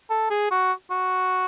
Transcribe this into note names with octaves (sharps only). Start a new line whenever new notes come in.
A4
G#4
F#4
F#4